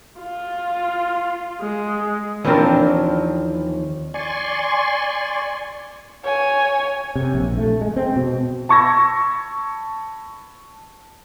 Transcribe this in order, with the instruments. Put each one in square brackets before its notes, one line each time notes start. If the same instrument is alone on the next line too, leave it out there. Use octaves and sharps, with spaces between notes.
[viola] F4
G#3
[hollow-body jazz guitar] D#2 E3 F3 C4 D4 A#4
[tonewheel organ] D5 G#5 C6 C#6
[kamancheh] C#5 G#5
[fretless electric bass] C3
A#1
A3
G#3
C4
B2
[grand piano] A5 B5 C#6 E6 G#6 A#6